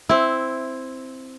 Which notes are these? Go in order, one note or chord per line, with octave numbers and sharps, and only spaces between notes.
C4 E4